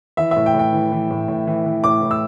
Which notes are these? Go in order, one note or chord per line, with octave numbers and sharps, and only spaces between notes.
E3 E5
E5
A2
G5
A2
G5
E3
E3
A2
A2
E3
E3
A2 D6
A2
E6